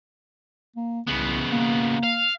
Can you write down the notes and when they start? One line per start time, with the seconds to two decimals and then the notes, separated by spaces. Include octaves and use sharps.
0.77 A#3
1.08 C2 C#3 B3
1.50 A#3
2.04 F5